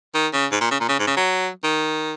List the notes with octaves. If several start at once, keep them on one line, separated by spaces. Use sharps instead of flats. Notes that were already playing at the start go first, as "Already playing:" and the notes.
D#3
C#3
G#2
A#2
C#3
A#2
C#3
G#2
C#3
F#3
D#3